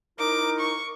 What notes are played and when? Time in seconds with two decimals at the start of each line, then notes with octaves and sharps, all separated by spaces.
0.19 D#4 E4 A#4 D6
0.60 C#6